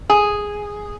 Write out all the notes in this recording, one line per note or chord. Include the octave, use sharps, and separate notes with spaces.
G#4